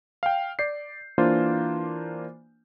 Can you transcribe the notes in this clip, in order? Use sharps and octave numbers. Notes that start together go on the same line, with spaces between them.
F5 G5
D5 G6 C7
E3 A#3 D4 F4 C5